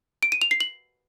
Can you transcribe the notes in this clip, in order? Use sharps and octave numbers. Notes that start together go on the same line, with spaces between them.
D7
D#7
F7
C7
F#7